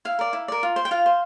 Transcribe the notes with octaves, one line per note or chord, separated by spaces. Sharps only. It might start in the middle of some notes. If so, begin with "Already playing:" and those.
E4 F5
A#4 D5
E4
A#4 D5
F4
C5
G5
F4 F5
C5